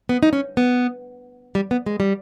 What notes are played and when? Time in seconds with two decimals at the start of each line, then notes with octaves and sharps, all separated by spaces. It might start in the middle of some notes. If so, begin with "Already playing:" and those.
0.09 B3
0.23 D#4
0.33 C#4
0.57 B3
1.55 G3
1.71 B3
1.86 G#3
2.00 G3